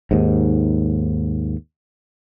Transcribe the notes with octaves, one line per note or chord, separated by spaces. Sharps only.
D#2 G#2